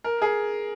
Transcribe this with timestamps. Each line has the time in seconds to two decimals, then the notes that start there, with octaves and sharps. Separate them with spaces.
0.04 A#4
0.22 G#4